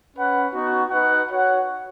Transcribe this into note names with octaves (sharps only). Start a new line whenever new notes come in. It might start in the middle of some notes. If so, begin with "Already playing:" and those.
C#4 B4 F#5
B3 D#4 F#4
D#4 B4 F#5
F#4 C#5 F#5